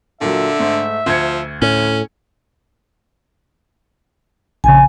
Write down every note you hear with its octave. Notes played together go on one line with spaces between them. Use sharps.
A#2 D3 F#3 E5
G#2 A3
D2 F3 G#6 C#7
A2 C#4
A#1 C#3 G#5